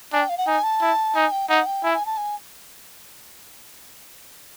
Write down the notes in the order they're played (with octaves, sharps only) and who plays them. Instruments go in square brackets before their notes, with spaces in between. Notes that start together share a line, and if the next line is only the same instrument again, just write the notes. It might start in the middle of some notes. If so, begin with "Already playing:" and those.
[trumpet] D4 [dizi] G#5
[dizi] G5
F5
F#5
[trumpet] D#4 [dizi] G#5
[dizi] A5
[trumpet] E4
[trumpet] D#4 [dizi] G#5
[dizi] G5
[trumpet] D#4 [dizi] F#5
[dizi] G5
[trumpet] E4 [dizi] G#5
[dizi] G#5
A5
G#5